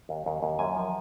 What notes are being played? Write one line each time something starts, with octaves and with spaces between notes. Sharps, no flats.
D#2
D#2
D#2
F#2 G#5
F3